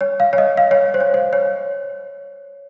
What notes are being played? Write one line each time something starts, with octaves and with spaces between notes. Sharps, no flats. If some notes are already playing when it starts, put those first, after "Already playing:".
C#5
F5
C#5
D#5
F5
C#5
C5
C#5
C5
C#5